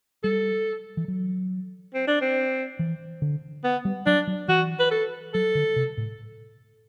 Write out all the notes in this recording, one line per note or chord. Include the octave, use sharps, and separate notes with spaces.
G3 A4
E3
F#3
C4
D4
C4
E3
D3
B3
G3
F#3 D4
F#3
E3 F#4
B4
A4
F#3 A4
D3
C3
A2